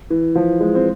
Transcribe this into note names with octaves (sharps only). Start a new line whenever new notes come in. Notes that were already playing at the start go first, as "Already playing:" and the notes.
E3
F3
G#3
C4